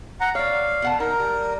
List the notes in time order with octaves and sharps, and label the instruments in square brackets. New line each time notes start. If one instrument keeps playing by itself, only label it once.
[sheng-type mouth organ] F#5 A#5
[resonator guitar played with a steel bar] C#5 D5 [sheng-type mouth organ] F5
[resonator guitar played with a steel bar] B2 F#5 A5
[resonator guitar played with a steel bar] D#4 [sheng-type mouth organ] A#4
[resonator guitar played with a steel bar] G3